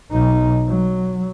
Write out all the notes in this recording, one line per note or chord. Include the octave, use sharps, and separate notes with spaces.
B1 D#4
F#3